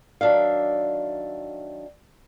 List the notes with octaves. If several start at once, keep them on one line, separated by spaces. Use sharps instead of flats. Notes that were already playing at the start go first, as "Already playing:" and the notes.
D#3 F#3 D4 E5 F5